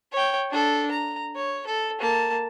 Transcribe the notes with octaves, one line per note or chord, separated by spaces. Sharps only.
C#5 G5
D4 A4
A#5
C#5
A4
A#3 A5